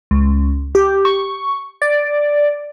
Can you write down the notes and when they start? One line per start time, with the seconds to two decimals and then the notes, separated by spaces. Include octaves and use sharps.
0.11 C#2
0.75 G4
1.05 C#6
1.82 D5